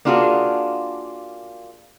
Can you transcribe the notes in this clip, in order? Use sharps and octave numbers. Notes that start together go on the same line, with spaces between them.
A#3 D4 F4 F#4 G#4